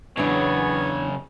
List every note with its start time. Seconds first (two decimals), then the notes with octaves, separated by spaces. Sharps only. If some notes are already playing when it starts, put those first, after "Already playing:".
0.17 E2 C#3 F#3 B3 D4 C#5